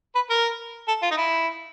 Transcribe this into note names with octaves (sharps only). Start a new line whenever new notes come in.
B4
A#4
A4
F4
D#4
E4